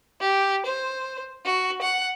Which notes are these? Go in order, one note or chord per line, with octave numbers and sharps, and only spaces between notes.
G4
C5
F#4
F#5